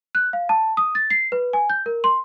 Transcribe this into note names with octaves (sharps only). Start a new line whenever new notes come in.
F#6
F5
A5
D#6
A6
C7
B4
G#5
G6
A#4
C6